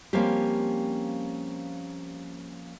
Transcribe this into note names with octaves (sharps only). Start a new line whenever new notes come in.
F3 G3 A#3 C4 C#4 G4